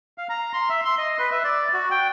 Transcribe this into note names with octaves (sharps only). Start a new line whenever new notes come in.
F5
A#5
C6
E5
C6
D#5
B4
E5
D5
F#4
G5